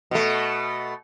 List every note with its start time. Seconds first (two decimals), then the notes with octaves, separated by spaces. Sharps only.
0.11 B2 A3